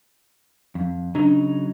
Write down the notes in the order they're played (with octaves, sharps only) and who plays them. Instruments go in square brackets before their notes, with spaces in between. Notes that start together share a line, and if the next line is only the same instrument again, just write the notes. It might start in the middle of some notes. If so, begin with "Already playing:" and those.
[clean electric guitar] F2
[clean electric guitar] C#3 F#3 D#4 [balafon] D4